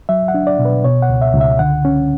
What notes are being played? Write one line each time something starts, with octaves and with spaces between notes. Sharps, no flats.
F#3 E5
F#5
D4
D5
B2
B4
B2 C#5
F#5
C#2
E5
C#2
E5
D3 F#5
C#4